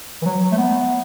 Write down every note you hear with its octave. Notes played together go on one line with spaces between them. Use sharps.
E3
F#3
A3
B3